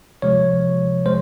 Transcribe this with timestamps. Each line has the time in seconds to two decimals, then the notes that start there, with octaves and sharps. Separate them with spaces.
0.22 C3 F3 G#3 C#5
1.06 G#3 C5